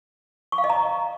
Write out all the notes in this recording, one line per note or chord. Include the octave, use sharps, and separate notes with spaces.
C#6
F5
D#5
A#5